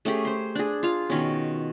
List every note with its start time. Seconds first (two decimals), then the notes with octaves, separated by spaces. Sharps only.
0.05 A3 C#4 G4 G#4
0.25 C5 C6
0.55 D4 G#4
0.83 F4 F5
1.10 B2 D#3 C#4